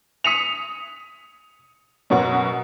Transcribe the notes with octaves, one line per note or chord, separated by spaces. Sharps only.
D#6 B6 C#7 D#7 F7
F#2 B2 F#5 C#6